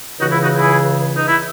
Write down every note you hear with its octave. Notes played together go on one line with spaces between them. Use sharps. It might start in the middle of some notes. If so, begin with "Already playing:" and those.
C#2 C#3 E3 D#4 F#4
E4
D#4 F#4
E4 G#4
D#4
E4